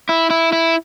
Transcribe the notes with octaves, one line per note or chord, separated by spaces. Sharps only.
E4
E4
E4